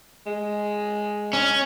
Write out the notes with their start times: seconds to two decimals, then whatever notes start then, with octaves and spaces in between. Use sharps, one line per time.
0.26 G#3
1.33 C#4